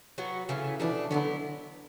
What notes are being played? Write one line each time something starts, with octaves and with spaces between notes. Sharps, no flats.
F#3 B3 F#4
C#3 E3 A3 C#4
B2 E3 A3 D4
D3 F#3 B3 E4